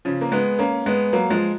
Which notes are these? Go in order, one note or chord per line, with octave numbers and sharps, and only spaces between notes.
C#3 F3
A#3
G#3 B3
A#3 C#4
G#3 B3
F#3 A#3
F3 G#3